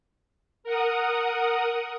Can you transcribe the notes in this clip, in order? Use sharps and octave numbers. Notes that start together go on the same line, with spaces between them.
A#4 F#5 D#6